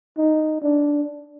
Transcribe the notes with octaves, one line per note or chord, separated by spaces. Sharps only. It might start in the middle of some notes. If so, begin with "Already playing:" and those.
D#4
D4